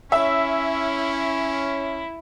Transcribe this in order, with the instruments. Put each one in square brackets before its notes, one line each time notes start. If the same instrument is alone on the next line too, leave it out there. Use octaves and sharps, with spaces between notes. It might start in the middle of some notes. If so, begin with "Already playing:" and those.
[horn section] C#4 [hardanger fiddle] E4 [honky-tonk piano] E5